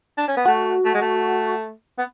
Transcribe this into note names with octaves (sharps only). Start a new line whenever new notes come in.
D4
C#4
B3
A3 F#4
A3
G#3
A3
B3